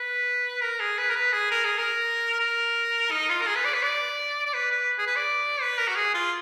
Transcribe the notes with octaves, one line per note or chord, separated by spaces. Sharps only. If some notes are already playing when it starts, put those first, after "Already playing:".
Already playing: B4
A#4
G#4
B4
A#4
B4
G#4
A#4
G#4
A#4
A#4
D#4
F4
A#4
G#4
B4
D5
B4
D5
D5
B4
B4
G#4
B4
D5
B4
A#4
F#4
G#4
F4